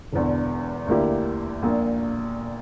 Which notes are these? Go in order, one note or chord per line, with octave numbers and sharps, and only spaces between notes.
E1 E2 D3
D2 D3 A#3 E4 G4
A#1 A#2 A#3